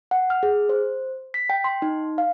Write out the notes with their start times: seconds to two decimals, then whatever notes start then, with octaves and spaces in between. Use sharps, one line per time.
0.11 F#5
0.30 F6
0.43 G#4
0.69 C5
1.34 B6
1.50 G5
1.64 C6
1.82 D#4
2.18 F5